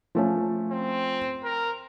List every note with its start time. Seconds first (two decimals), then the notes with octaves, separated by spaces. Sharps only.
0.15 F3 A3 C#4
0.71 C4
1.44 A#4